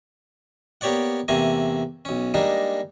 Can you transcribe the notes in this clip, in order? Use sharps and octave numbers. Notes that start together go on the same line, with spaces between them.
A#3 B3 G4 C#5 D5 F#5
E2 C3 A3 A#3 G#5
B1 C#4
G3 G#3 A#3 D4 D#4